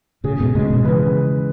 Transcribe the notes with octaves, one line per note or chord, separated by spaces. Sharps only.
A2 C#3 G#4
G#2 B2
A2 C#3 G#3
B2 D#3
C#3 E3 B4